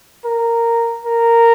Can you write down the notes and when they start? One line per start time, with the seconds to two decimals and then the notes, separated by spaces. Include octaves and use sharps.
0.24 A#4
1.05 A#4